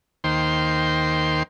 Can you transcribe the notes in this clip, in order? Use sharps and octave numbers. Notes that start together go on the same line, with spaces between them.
D#2 D#3 A#3 C5 G5 C6